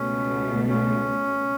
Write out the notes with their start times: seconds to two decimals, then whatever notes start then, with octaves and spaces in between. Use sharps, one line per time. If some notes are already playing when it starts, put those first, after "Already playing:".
Already playing: C#2 B2 A3 C#4
0.69 C#4